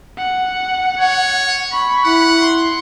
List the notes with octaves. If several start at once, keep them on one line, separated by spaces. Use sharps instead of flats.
F#5
C#5
B5 C#6
E4 F#5
C6